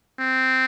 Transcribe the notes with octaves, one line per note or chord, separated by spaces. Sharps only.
C4